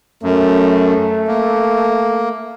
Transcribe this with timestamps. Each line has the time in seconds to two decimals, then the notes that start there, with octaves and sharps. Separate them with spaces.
0.23 F#2 A3
1.27 A#3